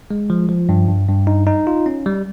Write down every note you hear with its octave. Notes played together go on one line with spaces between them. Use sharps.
G#3
F3
F3
G2
G2
G2
D#4
D#4
F4
C#4
G3